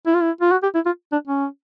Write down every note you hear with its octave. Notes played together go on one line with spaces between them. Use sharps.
E4
F4
E4
F4
F#4
G4
E4
F4
D4
C#4